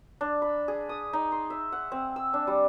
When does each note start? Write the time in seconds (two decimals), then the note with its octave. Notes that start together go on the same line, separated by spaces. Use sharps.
0.21 D4
0.42 B5
0.68 G#4
0.89 D#6
1.13 D#4
1.32 C6
1.50 E5
1.72 F#5
1.92 C4
2.16 E6
2.34 D4
2.47 G3